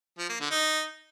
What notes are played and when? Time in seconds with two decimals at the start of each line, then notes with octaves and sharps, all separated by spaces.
0.18 F3
0.29 A#3
0.40 D3
0.51 D#4